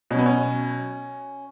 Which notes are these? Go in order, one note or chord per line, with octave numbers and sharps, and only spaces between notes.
B2 F#3 B3 C#4
C#4